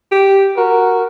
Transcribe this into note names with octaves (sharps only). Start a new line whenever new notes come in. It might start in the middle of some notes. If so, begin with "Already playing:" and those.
G4
F#4 A#4